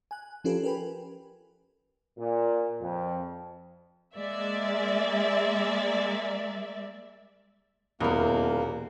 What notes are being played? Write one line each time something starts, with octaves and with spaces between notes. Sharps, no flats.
G#5 F#6
F3 C#4 F4 G4 A4 B4
A#4 B4 G5 G#5 B5
A#2
F2
G#3 A#3 D5 E5
D#1 E2 B2 A#3 A#4